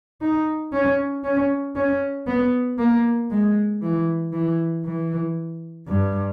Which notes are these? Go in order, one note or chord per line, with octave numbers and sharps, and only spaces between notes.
D#4
C#4
C#4
C#4
B3
A#3
G#3
E3
E3
E3
G2